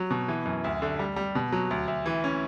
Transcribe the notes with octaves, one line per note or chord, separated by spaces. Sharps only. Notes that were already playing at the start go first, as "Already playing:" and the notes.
Already playing: F#3
B2
E3
F#2
D2
D3
G3
G3
B2
F#3
D2
D2
E3
C#4